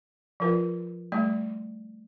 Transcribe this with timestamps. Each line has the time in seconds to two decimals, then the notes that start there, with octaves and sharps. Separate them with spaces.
0.40 F3 F4 A#4 B4
1.12 G3 A3 D5